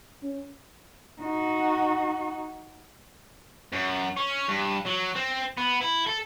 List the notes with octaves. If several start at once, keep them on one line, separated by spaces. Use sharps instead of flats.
C#4
D#4 F#4
F#2
C#4
G2
F#3
C4
B3
E4
A4